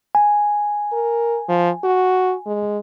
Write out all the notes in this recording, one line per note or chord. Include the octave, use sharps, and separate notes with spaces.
G#5
A#4
F3
F#4
G#3